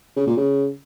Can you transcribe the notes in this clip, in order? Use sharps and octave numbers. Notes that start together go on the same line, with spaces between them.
C#3
A#2
C#3